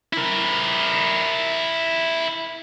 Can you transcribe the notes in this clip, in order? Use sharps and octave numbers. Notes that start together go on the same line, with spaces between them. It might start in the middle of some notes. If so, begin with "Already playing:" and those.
E4 A#4